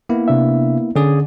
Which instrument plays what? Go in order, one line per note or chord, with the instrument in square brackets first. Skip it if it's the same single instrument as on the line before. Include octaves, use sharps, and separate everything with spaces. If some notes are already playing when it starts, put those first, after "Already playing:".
[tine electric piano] A#3 B3 E4
[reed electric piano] C3 D4 E5
[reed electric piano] D3 [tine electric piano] C#4 G#4 D5